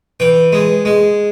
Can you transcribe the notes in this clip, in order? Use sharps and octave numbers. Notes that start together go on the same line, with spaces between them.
E3 G5
G#3
G#3